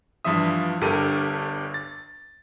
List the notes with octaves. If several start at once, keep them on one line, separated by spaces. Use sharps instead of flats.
G2 E3 F3 F4 E5 D#6
G1 G2 G4 A4 A#4 D#7
A6